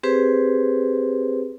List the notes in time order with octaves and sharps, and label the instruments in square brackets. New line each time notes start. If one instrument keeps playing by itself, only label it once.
[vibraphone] C4 G4 G#4 B4 C5